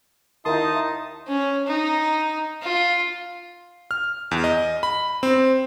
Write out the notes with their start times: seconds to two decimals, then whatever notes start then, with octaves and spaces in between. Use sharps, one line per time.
0.45 D#2 D#4 E4 A#4 A5 C6 D#6
1.28 C#4
1.67 D#4
2.63 F4
3.91 F6
4.31 E2
4.44 D#5
4.83 B5
5.23 C4